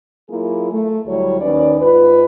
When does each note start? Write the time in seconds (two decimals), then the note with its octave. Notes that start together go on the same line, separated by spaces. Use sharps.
0.29 F#3 A#3 E4 F4 G#4
0.71 A3
1.06 D2 F#3 G3 E4 C#5
1.40 D#2 C#4 D#4 B4 D5
1.81 G#2 F4 B4